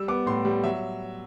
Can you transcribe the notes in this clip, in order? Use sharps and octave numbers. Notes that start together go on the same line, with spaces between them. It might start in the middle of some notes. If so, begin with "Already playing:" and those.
Already playing: G3 E6
B3 D6
A2 C6
G3
F#3 E5